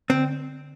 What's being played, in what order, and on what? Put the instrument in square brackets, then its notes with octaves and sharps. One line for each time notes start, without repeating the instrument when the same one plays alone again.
[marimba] D3 [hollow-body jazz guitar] C4